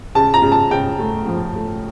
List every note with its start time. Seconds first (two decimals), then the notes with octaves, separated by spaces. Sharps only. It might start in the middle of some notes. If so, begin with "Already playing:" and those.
0.15 C#3 A5
0.34 A#5
0.42 C#3
0.52 A5
0.71 C#3 G5
0.99 A3
1.27 F3
1.56 A3